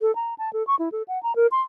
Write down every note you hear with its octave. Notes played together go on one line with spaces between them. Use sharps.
A4
A#5
A5
A4
C#6
E4
A4
F#5
A#5
A#4
C6